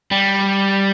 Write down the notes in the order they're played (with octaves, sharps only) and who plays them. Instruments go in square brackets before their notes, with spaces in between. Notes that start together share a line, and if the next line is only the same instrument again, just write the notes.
[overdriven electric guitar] G3